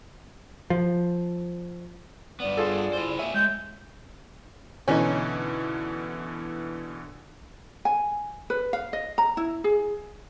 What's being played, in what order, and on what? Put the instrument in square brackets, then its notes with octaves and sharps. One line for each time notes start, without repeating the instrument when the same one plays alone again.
[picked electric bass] F3
[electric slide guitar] G2 B3 [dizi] D5
[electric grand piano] F4 G#4 A4
[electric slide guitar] E4 C5
[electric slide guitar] A#3 G4 G#5 [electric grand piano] C#5 E5
[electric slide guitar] G#3 [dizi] G6
[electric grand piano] B2 D3 E3 [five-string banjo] C#4 D#4
[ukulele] G#5
B4
F5
D#5
A#5
E4
G#4